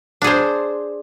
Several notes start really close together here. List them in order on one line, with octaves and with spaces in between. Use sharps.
D4 G#4 C5